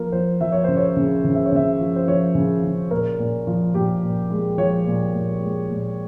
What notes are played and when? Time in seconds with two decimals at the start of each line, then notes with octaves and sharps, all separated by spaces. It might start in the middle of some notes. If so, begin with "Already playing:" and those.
Already playing: F3 A#3 A#4
0.12 F3 C5
0.41 F3 E5
0.52 C#5
0.64 C#3 C5
0.77 C#5
0.96 C#3
1.24 C#3
1.35 E5
1.45 C#5
1.52 C#3 E5
1.80 F3
1.96 C5
2.07 F3 C#5
2.35 C#3
2.64 C#3
2.91 A#2 A#4
3.19 A#2
3.47 F3
3.74 A#2 G4
4.03 A#2
4.30 G#3
4.58 F3 C#5
4.86 A#2
5.14 A#2
5.42 G#3
5.70 A#2